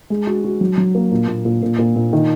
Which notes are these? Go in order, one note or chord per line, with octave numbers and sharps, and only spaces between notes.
G#3
F#4
F#4
F#3
F#3
A#3
A#2
A#2
A#2
A#2
A#2
A#2
D#3